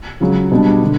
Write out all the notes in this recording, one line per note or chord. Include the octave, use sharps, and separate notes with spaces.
C#2 C#3 F#3
B2 G3 D4
D3